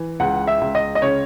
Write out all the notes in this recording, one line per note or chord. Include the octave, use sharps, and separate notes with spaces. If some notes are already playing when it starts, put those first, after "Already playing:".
Already playing: E3
C#2 F#5
E5
C#2
D#5
D#5
C#3 C#5